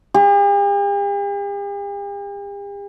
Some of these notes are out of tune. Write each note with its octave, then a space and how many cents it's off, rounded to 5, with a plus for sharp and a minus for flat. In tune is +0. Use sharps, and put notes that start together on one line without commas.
G4 +45